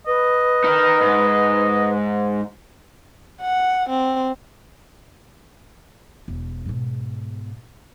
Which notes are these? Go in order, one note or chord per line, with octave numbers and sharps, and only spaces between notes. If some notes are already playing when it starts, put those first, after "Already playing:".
B4 D#5
D#4 A#4
G#2
F#5
C4
E1
G#2 B2